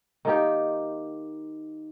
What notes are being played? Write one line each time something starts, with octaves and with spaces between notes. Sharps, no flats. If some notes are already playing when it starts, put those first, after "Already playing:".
D#3 A#3 D#4 G4